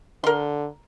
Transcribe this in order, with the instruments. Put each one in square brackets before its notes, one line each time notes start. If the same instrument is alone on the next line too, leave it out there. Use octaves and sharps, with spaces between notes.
[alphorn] D3 [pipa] A#4 C6